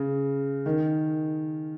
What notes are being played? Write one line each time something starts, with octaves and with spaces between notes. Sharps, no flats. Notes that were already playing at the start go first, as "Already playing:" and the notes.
Already playing: C#3
D#3